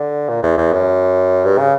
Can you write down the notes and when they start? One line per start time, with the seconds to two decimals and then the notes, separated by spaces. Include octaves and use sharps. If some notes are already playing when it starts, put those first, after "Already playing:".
Already playing: D3
0.29 A#2
0.43 E2
0.57 E2
0.73 F#2
1.45 G2
1.59 C#3